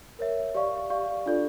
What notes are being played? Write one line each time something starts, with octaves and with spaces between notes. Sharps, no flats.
A#4 C#5 E5
G4 D5 F5 C#6
G4 D5 F5 C#6
D4 F4 A4 D5